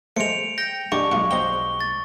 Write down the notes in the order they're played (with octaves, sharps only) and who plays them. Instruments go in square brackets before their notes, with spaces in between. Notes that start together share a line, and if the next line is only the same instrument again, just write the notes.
[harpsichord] G#3 A3 [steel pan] C5 [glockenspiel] C#7 D7 F7
[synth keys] G5 [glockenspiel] A#6
[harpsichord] G#3 F#5 A#5 [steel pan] D4 G4 [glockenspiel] C#6 D6
[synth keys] B1 G#3 [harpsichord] F4 F#5
[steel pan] C5 D#5 F#5 [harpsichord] G5 A#5 C6 [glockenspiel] G7
[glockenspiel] A6